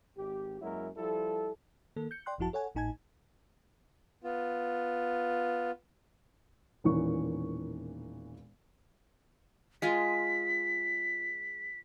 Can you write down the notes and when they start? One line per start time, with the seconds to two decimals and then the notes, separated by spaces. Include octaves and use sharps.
0.17 G#1 G4
0.61 F#2 F#3 G#3 A#3 E4 A#4
0.97 F3 G3 E4 A4
1.96 D#3 A#3 A4
2.11 G6 C#7
2.26 D5 G5 C6 F#6
2.38 G#1 F#2 F3 E4 F#4 A5
2.53 A4 C#5 F#5 G#5
2.75 G#1 A2 D#4 G#5 A5 G#6
4.24 B3 F4
6.84 E1 A#2 D#3 E3 C#4 C#6
9.82 G#3 F4 G#4 B6